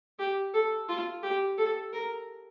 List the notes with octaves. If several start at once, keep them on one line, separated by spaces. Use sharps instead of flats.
G4
A4
F4
G4
A4
A#4